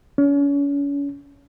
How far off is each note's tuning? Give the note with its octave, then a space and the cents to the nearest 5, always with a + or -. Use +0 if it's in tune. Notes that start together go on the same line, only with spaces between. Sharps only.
C#4 +35